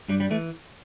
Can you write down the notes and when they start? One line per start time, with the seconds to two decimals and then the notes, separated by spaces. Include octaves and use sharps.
0.08 G2 G3
0.20 G3
0.31 E3 A3